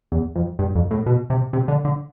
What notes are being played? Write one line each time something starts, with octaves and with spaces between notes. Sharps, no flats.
E2
F2
G2
F2
A2
B2
C3
C3
D3
D3